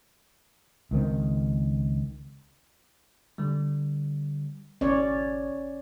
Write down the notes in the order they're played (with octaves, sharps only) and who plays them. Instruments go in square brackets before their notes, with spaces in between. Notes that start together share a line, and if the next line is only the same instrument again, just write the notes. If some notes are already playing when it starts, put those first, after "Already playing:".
[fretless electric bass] C#2 D#3 C4
[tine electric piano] D3 G3
[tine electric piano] G#1 [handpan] C#4 C#5 D5